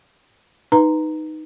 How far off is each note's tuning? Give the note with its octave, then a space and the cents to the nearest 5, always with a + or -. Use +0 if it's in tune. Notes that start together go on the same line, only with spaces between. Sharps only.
D#4 +0 B4 +0 A#5 -10